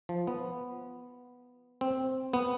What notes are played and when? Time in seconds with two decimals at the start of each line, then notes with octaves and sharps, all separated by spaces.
0.09 F3
0.27 B3
1.81 C4
2.33 B3